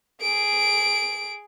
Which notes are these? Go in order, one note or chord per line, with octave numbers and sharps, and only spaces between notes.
G#4 D7